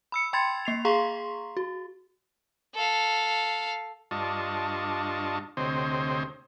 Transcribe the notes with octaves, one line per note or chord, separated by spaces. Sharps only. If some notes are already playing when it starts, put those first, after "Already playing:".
B5 E6 C#7
G5 B5 C6 G#6 A6
A#3 C7 F7
G#4 F5 A#5 C6 C#6
F#4
A4 F5
G2 D4 F4 D#5 A5 C#6
D2 C3 C4 C5 C#5 D#5